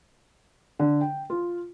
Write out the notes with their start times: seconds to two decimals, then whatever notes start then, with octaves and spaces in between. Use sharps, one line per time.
0.79 D3
1.01 G5
1.30 F4